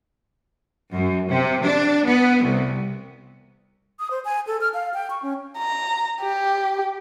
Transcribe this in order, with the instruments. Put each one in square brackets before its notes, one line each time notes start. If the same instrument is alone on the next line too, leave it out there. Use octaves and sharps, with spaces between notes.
[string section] F#2
C3
D4
B3
C2
[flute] D#6
C5
G#5
A4
F6
F5
G5
C#6
C#4
[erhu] A#5
G4